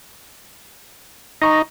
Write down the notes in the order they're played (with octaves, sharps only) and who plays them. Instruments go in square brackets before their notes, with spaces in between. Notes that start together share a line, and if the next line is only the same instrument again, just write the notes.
[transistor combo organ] D#4 [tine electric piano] A#5 C#6 A#6